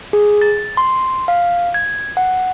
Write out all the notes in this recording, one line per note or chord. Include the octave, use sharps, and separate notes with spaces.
G#4
A6
C6
F5
G#6
F#5